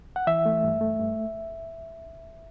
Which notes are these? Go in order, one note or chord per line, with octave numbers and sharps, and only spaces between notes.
F#5
E3 E5
A3
G2
A3
G2